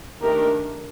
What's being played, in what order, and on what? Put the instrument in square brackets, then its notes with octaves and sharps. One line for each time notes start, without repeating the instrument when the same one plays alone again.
[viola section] D#3 A3 D4 G4 A#4